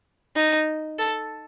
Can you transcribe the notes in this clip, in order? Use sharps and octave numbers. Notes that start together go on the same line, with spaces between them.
D#4
A4